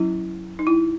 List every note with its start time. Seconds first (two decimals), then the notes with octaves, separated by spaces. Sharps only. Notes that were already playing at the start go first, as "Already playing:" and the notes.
Already playing: F#3 C#4 E4
0.59 D#4
0.67 E4